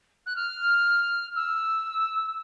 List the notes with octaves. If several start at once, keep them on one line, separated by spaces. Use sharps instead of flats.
F#6
F6
E6